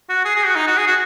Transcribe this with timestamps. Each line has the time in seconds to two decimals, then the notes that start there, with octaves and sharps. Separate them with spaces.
0.09 F#4
0.25 G#4
0.36 G#4
0.46 F#4
0.56 D#4
0.67 F#4
0.77 G#4
0.87 F#4